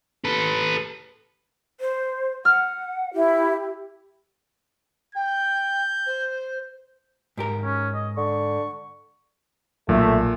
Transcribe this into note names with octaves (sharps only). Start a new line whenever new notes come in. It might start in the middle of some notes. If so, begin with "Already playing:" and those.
A4 B4
C5
F#5 F6
E4 G4
G5 G6
C5
G#2 G4 A#4
C#4
D#5
D3 C#6
B1 A#2 F#3 A3